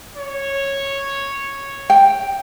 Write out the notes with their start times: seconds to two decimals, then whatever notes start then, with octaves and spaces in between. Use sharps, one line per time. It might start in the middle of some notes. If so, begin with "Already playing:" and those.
0.17 C#5
1.90 G5